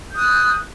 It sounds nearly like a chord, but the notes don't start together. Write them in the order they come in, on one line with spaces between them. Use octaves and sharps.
G6 D#6 F#6